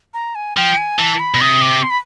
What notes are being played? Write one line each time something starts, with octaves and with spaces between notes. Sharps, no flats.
A#5
G#5
F3 G5
G#5
E3 A5
B5
B2
C3 D#6
D6
C6
B5